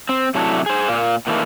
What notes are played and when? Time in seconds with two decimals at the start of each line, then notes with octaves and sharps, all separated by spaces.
0.09 C4
0.35 C3 F#3 A3 D4 E4
0.66 G#4 C5
0.88 A#2 A#3
1.27 A#2 D#3 E3 A3 A#3